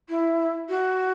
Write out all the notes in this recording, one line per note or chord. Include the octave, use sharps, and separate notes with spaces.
E4
F#4